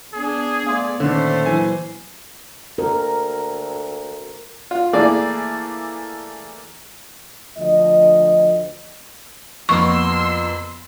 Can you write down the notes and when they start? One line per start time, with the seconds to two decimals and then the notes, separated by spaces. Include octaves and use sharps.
0.14 B3 D4 G#4
0.67 A3 B3 D5 F5 C6
1.00 A#2 D3 D#3 A3 C#4 C5 C#5
1.46 E3 F#3 G#5
2.78 D2 A#4
4.71 F4
4.93 E3 A3 A#3 G#4 D5
7.58 D2 F3 D#5
9.69 F2 A#3 B3 C6 C#6 E6